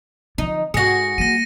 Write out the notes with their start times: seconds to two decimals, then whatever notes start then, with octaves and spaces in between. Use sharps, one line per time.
0.38 D3 F3 D#4
0.74 G#2 F#4 G#4 A#6 C#7
1.18 G3 A#3 A#6 D#7